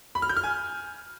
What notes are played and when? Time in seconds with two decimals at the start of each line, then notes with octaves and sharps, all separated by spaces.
0.15 B5
0.22 F6
0.29 G6
0.37 F6
0.44 G#5